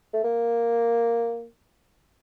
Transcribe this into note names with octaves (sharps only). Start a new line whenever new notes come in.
A3
A#3